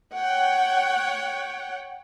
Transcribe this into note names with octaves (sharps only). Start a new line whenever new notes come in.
C#5 F#5 G5